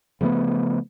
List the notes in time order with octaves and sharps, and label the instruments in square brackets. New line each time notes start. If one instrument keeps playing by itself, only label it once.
[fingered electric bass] C#3 F3 A3 B3